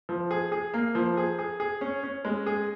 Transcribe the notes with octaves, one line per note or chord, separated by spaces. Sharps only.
F3
G#4
G#4
A#3
F3
G#4
G#4
G#4
C#4
C#4
G#3
G#4